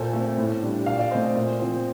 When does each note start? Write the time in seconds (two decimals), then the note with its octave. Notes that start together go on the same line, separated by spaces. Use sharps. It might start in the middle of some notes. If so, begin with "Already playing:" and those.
Already playing: A#2 A4 C5
0.13 A3 C4
0.38 A2
0.62 G3 D4
0.86 A#2 D5 F5
0.99 D5
1.11 A3 C4 C5 D#5
1.35 A#2
1.59 F3 C4